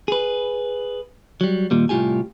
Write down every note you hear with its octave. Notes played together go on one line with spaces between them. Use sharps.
G#4 B4
F#3 G3
D#2 A#2 G3
C2 A2 F4 G4 G#5